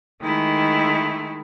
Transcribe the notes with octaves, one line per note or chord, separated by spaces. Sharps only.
D#3 G#3 A3 E4